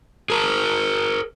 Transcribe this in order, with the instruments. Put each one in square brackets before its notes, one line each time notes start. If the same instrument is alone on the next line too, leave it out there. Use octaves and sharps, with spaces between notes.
[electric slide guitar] G#4 A#4